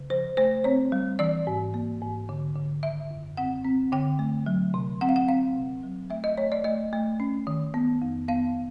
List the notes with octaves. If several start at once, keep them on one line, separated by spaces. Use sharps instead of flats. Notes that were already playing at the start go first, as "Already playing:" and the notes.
Already playing: C#3
F3 C5
A3 C5
C4 C#5
G3
E3 D5
G#2
A#3
G#2
D3
D3
D#3 E5
F#2
C4 F#5
C4
D3 G5
A3
F#3
C3
C4 F#5
F5
F#5
C4 F5
C3
F#3
A3 E5
D#5
A3 C#5
D5
A3 D#5
A3
C#4
D#3
B3
F2
B3 F5